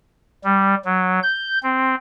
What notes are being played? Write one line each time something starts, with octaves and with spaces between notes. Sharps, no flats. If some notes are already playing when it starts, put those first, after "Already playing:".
G3
F#3
G6
C4